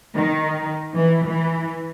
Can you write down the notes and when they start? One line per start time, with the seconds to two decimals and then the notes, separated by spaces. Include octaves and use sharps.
0.15 D#3
0.95 E3
1.26 E3